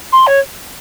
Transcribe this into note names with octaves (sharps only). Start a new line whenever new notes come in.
C6
C#5